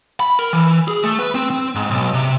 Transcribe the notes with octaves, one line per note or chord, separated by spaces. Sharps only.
B5
A#4
E3
G#4
A3
B4
C4
C4
G#2
B1
C3